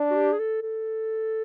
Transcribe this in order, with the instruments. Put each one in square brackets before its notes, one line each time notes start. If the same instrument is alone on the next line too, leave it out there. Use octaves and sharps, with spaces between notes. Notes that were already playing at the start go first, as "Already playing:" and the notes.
Already playing: [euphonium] D4
[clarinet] F#4
G4
G#4
A4
A4